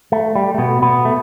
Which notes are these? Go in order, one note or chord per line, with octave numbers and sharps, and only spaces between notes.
A3
G3
A3
B2 B3
B2 B3
A3